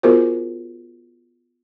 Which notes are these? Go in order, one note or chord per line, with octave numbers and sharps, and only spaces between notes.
B3 F4 F#4 G#4 A#4 C5